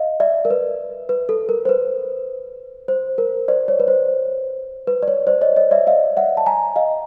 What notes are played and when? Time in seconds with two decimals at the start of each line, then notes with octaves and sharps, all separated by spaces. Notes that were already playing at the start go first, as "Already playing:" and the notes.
Already playing: D#5 F5
0.20 D5 E5
0.45 A#4
0.50 B4
1.09 B4
1.29 A4
1.49 A#4
1.65 C5
1.69 B4
2.88 C5
3.18 A#4
3.48 C5 D5
3.68 C#5
3.80 B4
3.88 C5
4.87 B4
5.03 D5
5.08 C#5
5.27 C5 D5
5.41 C#5 D#5
5.56 C#5 D#5
5.71 D5 E5
5.87 D#5 F5
6.17 E5 F#5
6.37 A5
6.46 G#5 A#5
6.76 D#5 F5